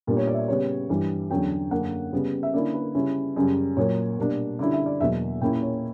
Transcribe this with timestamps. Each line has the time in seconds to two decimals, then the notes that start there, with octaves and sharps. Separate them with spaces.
0.07 A#2 G3 B3 D4 A#4
0.17 C#5
0.27 D5
0.34 E5
0.38 D5
0.48 C#3 G3 B3 C#5
0.89 G2 E3 G3
1.31 E2 D3 F#3 C#4 G5
1.71 F#2 D3 A#3 C#4 F#5
2.13 C#3 G3 B3
2.43 E5
2.54 D3 A#3 C#4 E4 D5
2.74 B4
2.95 C#3 G3 C#4 E4
3.36 F#2 C#3 G3
3.77 A#2 F#3 A#3 C#5
4.18 B2 G3 A#3 D4
4.59 D3 G3 C#4 E4 D5
4.73 E5
4.86 D5
5.00 E2 B2 F#3 A#3 E5
5.41 A#2 A#3 C#4 E4 G5
5.62 C#5